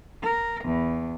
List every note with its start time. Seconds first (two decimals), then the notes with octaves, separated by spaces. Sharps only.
0.23 A#4
0.64 E2